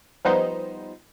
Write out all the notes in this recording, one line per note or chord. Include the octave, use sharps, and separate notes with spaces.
F3 G3 B3 D#4 C5